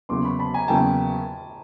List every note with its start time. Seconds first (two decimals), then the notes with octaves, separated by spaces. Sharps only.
0.09 E2 C#3 F#3 A#3 C6 D6
0.24 B5 C#6
0.39 A5 B5
0.54 G#5 A#5
0.68 E2 C#3 F#3 A#3 G5 A5